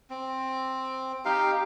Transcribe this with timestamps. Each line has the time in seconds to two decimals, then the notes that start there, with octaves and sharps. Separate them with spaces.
0.10 C4
1.25 D#4 G4 F5